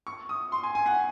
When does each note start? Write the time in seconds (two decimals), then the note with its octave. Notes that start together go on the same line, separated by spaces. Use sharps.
0.07 C#6
0.29 D#6
0.52 C6
0.63 G#5
0.75 G#5
0.86 F#5